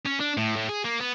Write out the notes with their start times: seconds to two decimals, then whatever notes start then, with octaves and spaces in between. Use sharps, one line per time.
0.06 C#4
0.20 D4
0.37 A2
0.56 A2
0.69 G#4
0.84 A#3
1.00 B3